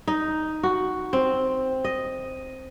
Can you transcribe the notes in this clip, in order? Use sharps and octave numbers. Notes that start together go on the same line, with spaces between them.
D#4
F#4
C4
D#5